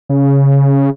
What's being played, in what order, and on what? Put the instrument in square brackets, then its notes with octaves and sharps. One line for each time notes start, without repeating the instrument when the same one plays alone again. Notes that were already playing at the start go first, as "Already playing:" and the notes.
[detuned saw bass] C#3